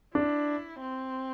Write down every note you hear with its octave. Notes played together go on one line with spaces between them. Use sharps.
D4 E4
C4